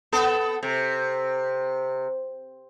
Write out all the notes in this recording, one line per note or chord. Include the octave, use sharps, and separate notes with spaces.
B3 A4
C3